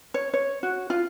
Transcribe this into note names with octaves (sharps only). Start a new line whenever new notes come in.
C#5
C#5
F#4
F4